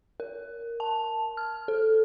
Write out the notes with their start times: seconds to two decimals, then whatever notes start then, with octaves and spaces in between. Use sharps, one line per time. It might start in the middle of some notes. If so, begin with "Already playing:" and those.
0.20 A#4
0.80 A5
1.37 F6
1.68 A4